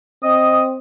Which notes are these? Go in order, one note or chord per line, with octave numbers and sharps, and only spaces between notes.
C4 D#5 D#6